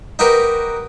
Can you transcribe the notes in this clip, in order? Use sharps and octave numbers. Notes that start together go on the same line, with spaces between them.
D#4 F#4 G4 A#4 B4